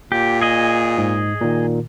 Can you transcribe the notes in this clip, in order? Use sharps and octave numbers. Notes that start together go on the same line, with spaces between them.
A#2 G4
G#4 D#5
G#2
A#2 D#3